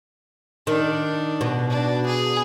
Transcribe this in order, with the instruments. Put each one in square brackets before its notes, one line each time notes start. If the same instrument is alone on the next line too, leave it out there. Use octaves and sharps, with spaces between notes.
[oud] D#3 [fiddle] D4
[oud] B2
[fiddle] D4
G#4